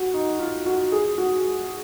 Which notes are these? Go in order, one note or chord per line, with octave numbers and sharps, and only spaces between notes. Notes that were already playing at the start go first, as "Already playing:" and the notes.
Already playing: F#4
D#4
F4
F#4
G#4
F#4